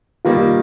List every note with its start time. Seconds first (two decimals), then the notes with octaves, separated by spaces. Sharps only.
0.25 D#3 G3 A#3 F4